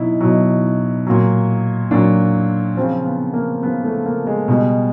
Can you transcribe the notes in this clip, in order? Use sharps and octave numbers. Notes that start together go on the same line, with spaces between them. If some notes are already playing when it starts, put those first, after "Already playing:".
Already playing: B2 F#3 D#4 E4
B2 F#3
A#2 F#3
A#2 F#3 D4
C#3 F3 C4
B3
A#3
C#3 F3 B3
A3
A#3
G#3
B2 G3